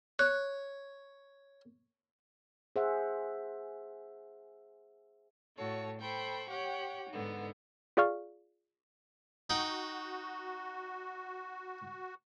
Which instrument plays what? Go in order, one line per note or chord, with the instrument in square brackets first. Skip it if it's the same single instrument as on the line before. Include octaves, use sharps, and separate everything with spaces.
[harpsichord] C#5 [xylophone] F#6
[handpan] G#4 C5 E5 F#5
[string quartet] A2 F#4 A4 C#5 A5
A4 C5 G5 B5 C#6
G4 C#5 F#5 G5
G#2 D3 B3 D#4
[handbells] F4 G#4 D5 F5 C#6 F6
[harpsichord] D#4 F#5 G5 [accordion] F#4